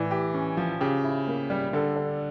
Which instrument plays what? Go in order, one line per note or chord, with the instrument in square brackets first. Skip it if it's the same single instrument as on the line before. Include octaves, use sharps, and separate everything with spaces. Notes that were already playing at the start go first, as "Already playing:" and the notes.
Already playing: [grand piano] A2 D5 [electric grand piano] E3
[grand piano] G4
C#4
F3
[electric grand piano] C#3 [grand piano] G4
[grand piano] E4
A#3
G3
[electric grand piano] D3 [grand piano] A4
[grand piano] D4